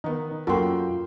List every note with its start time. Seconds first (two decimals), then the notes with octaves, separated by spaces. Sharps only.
0.04 D#3 B3 D#4
0.47 F#2 A#3 F4 F#4 A4 G5 C6